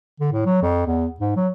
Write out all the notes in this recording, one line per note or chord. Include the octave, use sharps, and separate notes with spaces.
D3
A2
F#3
F2
E2
G#2
F#3